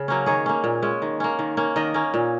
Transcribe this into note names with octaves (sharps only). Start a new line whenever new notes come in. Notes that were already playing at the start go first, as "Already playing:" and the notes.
Already playing: C#3
F#3 A#3 C#4
D#3 G#4 C#5
A#3 C#4
A#2
G#3 C#4
D#3
A#3 C#4
D#3
A#3 C#4
D#3 A#4 D#5
A#3 C#4
A#2